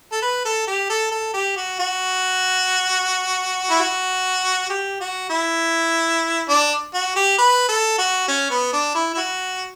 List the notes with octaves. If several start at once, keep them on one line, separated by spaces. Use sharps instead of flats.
A4
B4
A4
G4
A4
A4
G4
F#4
F#4
E4
F#4
G4
F#4
E4
D4
F#4
G4
B4
A4
F#4
C#4
B3
D4
E4
E4
F#4